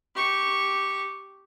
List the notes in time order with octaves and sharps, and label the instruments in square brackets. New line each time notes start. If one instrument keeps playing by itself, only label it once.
[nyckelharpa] G4 C#6